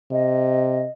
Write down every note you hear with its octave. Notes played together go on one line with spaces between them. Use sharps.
C3 D#5